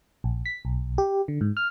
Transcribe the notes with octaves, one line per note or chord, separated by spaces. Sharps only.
A#1
B6
B1
G4
D3
G#2
F6